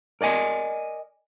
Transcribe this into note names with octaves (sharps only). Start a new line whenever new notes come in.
A#4 D5 D#5 G#5